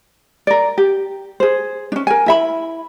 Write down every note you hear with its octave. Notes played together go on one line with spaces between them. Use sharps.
A#4 D5
G4
G#4 C5
C#4 D4
A#4 G#5
E4 E5 B5